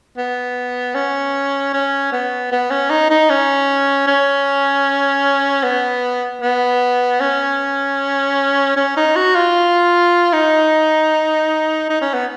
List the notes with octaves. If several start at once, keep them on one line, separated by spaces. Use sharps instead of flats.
B3
C#4
C#4
B3
B3
C#4
D#4
D#4
C#4
C#4
B3
B3
C#4
C#4
D#4
F#4
F4
D#4
D#4
C#4
B3